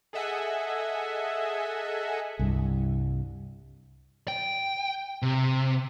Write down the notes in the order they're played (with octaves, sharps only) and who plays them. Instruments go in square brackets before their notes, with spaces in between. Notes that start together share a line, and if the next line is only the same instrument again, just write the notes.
[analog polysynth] G#4 A4 D#5 E5 F#5 G#5
[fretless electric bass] C2 G2
[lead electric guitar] G5
C3